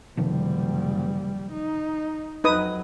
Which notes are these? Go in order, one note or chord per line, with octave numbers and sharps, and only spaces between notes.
F#1 C3 D#3 F3 G3
D#4
F2 F#3 D#4 B4 D#6